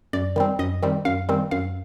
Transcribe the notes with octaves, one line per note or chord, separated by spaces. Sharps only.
F#2 D5
D#3 G3 C4
F#2 D#5
D#3 G3 C4
F#2 F5
D#3 G3 C4
F#2 F5